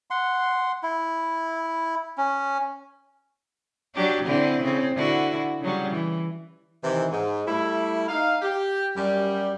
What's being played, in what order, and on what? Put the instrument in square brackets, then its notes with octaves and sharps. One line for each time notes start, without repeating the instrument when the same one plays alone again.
[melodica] F#5 C6
E4
C#4
[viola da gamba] F#3 D4 G4
D3 C4 E4
C#3 C4
D3 E4 F#4
C#3 F#3 G3
E3
[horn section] C3 D#3 E3
G#2
G3 A3 E4
D#4 F5
G4
F#2 G3